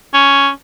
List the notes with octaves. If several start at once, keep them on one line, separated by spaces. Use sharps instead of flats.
C#4